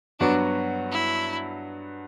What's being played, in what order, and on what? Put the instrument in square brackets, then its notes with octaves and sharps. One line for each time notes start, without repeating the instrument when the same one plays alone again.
[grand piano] G2 F#3 B3 F#4 [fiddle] D4
[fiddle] E4